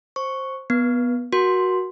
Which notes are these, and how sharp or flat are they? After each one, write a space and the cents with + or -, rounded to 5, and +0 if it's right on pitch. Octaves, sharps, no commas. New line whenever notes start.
C5 +10 C#6 +0
B3 -10 B4 -40
F#4 +0 A#4 +30 C6 +0